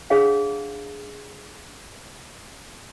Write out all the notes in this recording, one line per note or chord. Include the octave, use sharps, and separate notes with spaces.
D4 G#4 C#5 F5 F#5